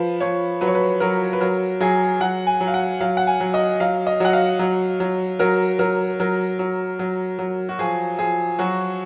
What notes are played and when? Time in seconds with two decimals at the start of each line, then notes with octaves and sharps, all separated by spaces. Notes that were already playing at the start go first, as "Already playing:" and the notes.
Already playing: F3 B4
0.20 F3 C#5
0.61 F#3 B4
0.68 C#5
0.75 B4
1.00 F#3 A#4
1.33 B4
1.41 F#3 A#4
1.80 F#3 G#4
2.20 F#3 F#5
2.47 G#5
2.61 F#3
2.67 F5
2.74 F#5
3.01 F#3 F5
3.17 F#5
3.27 G#5
3.40 F#3
3.54 D#5
3.80 F#3 F5
4.07 D#5
4.20 F#3 F#5
4.33 F5
4.59 F#3
5.00 F#3
5.39 F#3 A#4
5.79 F#3 A#4
6.20 F#3 A#4
6.59 F#3
6.99 F#3
7.39 F#3
7.69 F#4
7.79 F3 G#4
8.19 F3 G#4
8.59 F#3 F#4